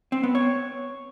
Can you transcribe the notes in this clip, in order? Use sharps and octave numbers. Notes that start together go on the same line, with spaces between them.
C4
B3
C#5